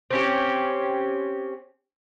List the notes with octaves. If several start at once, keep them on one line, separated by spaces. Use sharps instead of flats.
C4 C#4 G4